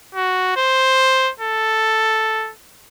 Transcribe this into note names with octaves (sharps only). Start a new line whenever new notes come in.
F#4
C5
A4